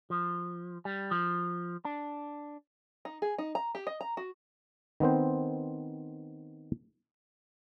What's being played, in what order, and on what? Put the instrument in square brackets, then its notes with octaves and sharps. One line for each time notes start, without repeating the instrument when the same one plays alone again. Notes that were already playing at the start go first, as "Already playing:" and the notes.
[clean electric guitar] F3
G3
F3
D4
[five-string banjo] D#4
G#4
D#4
A#5
G4
D#5
A#5
F#4
[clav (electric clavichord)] D#3 B3 C4 C5